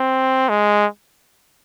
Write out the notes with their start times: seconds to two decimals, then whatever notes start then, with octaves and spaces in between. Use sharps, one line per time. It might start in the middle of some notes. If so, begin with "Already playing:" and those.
Already playing: C4
0.49 G#3